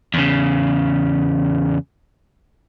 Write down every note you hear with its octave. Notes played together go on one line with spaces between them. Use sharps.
E2 C#3